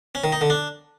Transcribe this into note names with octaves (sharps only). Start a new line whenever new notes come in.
C#4
D#3
D#4
D3
D4